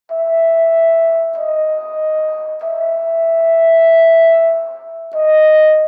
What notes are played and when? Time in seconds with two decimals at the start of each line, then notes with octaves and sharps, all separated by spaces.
0.11 E5
1.37 D#5
2.63 E5
5.15 D#5